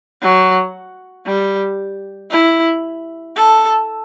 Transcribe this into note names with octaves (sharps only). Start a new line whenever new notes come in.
F#3
G3
E4
A4